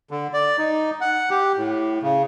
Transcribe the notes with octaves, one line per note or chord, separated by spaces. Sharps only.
D3
D5
D#4
F#5
G4
A2
C#3